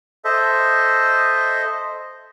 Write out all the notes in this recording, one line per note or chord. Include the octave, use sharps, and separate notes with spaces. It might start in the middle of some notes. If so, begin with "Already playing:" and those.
A4 C5 D#5 E5